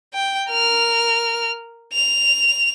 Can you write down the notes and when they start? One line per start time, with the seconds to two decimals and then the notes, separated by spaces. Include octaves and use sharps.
0.14 G5
0.50 A#4 F6
1.93 F7